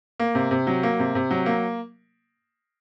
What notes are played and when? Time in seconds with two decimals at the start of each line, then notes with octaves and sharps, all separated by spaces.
0.20 A#3
0.35 C3
0.51 C3
0.67 F#3
0.83 A#3
0.99 C3
1.15 C3
1.31 F#3
1.46 A#3